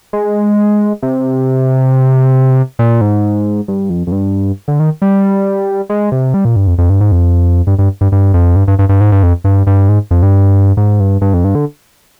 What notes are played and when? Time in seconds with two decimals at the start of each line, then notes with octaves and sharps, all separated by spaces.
0.13 G#3
1.02 C3
2.79 A#2
3.01 G#2
3.68 G2
3.90 F2
4.07 F2
4.12 G2
4.68 D3
4.80 D#3
5.02 G3
5.90 G#3
6.12 C3
6.34 G3
6.45 A#2
6.56 G2
6.67 F2
6.78 F2
6.90 G2
7.01 G#2
7.12 F2
7.67 G2
7.79 G2
8.01 G2
8.12 G2
8.34 F2
8.56 G2
8.68 G2
8.79 G2
8.89 G2
9.01 G#2
9.12 G2
9.23 F2
9.44 G2
9.67 G2
9.89 G#2
10.11 F2
10.23 G2
10.77 G#2
11.00 G2
11.21 G2
11.34 F2
11.44 G2
11.55 D3